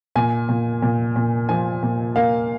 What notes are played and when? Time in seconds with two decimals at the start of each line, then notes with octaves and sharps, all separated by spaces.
0.16 A#2 G#5
0.49 A#2
0.82 A#2
1.16 A#2
1.49 F3 G#5
1.83 A#2
2.16 A#3 F5